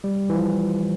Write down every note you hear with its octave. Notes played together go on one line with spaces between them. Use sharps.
G3
E3
F3